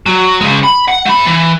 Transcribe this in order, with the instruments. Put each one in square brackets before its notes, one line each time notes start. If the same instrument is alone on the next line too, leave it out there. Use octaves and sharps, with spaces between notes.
[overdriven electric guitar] F#3
C#3 G#3
B5
F#5
A3 B5
E3